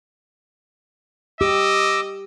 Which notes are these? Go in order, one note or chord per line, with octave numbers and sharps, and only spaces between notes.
G4 D#5 D6 E6